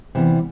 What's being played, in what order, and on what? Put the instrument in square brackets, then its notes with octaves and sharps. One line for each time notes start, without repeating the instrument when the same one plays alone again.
[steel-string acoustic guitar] C3 E3 G3 B3